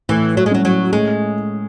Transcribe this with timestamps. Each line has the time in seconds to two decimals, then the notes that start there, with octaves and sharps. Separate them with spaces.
0.09 A2 E3
0.37 F#3
0.46 G#3
0.51 F#3 C#4
0.65 F#3
0.93 A2 G#3